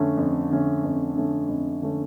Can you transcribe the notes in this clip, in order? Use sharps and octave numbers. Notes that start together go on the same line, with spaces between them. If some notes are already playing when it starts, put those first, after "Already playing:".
Already playing: F2 D3 A3 C#4
F2
D3 A3 C#4
F2
D3 A3 C#4
F2
D3 A3 C#4